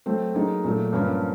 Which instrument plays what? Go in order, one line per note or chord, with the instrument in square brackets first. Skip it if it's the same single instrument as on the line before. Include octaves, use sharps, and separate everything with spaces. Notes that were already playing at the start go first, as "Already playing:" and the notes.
[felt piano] F#3 A3 C4
F#3 A#3 D#4 G#4
A#2 F#3 A3
G2 D3 F3 A#3 C#4